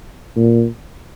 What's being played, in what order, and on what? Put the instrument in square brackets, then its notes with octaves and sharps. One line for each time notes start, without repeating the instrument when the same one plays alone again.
[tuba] A#2